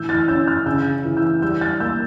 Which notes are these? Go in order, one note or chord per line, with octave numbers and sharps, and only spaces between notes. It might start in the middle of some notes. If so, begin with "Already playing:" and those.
Already playing: A2 E3 E6 G6
F6 A6
C#4 E6 G6
F6 A6
C#3 E6 G6
E3
E6 G6
G3 E6 G6
F6 A6
A#3 E6 G6